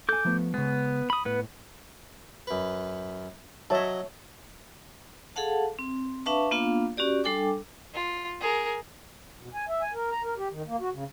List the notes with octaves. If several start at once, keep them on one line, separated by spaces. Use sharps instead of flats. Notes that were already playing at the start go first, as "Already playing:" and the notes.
A4 G#5 D6 G6
F3 A3 B3
C#3 G#3 B3
B5 D#6
A2 B3 B4
F#2 B4
F#3 C#5 D#5 E5 A5
G#4 A4 F5 F#5 A5
C4
D4 B4 E5 F5 A5 C#6
A#3 B3 D4 F4 F5
C#4 F#4 G4 D5
G3 D4 A4 G5 G#5 D6
F4
G#4 A#4
B2
G#5
E5
G#5
A#4
A#5
A#4
G4
D#3
A#3
F#4
C#3